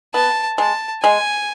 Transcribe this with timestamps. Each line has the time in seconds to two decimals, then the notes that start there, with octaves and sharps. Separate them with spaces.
0.14 B3 A5
0.58 G#3 A5
1.03 G#3 G#5